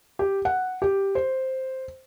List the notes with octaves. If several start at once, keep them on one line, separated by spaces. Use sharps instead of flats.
G4
F#5
G4
C5